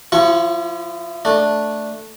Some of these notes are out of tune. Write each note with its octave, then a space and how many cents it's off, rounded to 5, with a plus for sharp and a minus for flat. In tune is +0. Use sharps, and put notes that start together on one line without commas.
F3 +10 E4 +40 C#6 +0
A3 +0 D4 +0